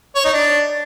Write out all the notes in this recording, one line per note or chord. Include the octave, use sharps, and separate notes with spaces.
C#5
D#4
D4